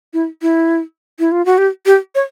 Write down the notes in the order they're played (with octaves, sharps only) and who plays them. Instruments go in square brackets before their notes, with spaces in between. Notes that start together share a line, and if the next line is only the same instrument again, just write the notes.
[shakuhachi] E4
E4
E4
F4
F#4
G4
G4
C#5